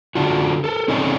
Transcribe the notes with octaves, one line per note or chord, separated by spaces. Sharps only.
D3 D4 F4 F#4
A4 A#4
C4 C#4 D#4 G#4 A4 D5